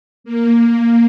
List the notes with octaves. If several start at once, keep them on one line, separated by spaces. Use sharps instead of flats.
A#3